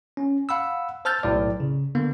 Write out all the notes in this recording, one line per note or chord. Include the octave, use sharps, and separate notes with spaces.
C#4
F5 F#5 B5 E6
C5 A5 E6 F6 G6 A6
B1 A2 D5
C#3
D3 A#3 B3